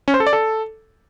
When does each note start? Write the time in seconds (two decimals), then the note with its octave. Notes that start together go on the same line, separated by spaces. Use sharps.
0.08 C#4
0.14 C5
0.20 A4
0.27 D5
0.33 A4